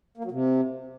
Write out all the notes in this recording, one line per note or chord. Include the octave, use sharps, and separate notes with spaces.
A#3
F#3
C3